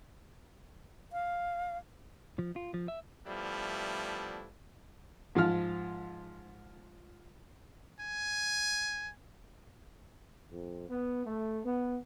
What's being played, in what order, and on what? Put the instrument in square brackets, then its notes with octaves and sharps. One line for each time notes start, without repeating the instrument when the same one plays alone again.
[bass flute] F5
[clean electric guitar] F3
F4
F3
E5
[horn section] F3 G3 A3 B3 D4 E4
[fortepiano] G#2 F3 F4 F6
[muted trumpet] G#5
[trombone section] F2
B3
A3
B3